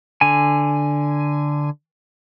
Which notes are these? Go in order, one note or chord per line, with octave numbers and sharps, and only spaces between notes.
D3 G#5